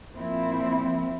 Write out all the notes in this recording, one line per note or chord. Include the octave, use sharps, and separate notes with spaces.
A#2 F3 C4 E4